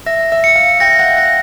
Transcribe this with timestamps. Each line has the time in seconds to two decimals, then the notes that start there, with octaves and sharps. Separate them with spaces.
0.06 E5 A#6
0.32 E5
0.44 C#7
0.56 F5
0.80 G5 A#6
0.99 F#5
1.17 F5 A#6